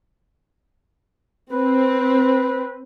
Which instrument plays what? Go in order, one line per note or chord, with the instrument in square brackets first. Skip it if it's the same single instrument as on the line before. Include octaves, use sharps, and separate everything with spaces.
[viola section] C4 [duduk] B4